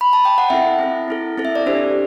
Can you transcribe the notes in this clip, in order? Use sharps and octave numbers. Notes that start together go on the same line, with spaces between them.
B5
A5
G5
F#5
C4 E4 A4 E5
C4 E4 A4
C4 E4 A4
C4 E4 A4
E5
D5
D4 G4 C5